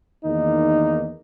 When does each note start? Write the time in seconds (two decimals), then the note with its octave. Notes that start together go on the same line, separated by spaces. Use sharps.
0.24 E2 D#3 A#3 D#4